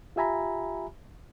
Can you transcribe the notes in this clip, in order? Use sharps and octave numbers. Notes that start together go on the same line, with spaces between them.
F4 G4 E5 G#5 A#5 B5